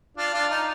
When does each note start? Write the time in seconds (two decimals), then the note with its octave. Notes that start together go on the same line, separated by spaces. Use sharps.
0.17 D4 F4
0.33 D4 F4
0.50 D#4